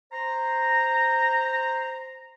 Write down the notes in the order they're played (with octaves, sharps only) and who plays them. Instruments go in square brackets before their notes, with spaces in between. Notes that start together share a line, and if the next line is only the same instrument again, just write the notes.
[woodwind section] C5 A#5